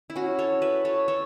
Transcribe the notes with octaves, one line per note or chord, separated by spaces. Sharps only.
E4
C#4 F#4
A4 C#5
B4 E5
A4 C#5
A4 C#5